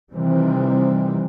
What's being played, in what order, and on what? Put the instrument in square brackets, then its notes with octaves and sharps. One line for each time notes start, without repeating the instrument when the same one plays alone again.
[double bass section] C3 D#3 E3 G3 C4